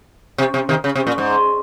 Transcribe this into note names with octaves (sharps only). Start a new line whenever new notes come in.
C3
C3
C3 D#3
C#3
C3
A#2
G#2